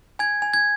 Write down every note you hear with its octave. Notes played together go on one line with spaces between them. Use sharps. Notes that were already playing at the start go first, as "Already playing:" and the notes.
G#5 G#6
G#5
G#6